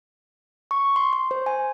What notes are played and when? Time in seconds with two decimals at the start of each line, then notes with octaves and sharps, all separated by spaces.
0.71 C#6
0.96 C6
1.13 C6
1.31 C5
1.46 G#5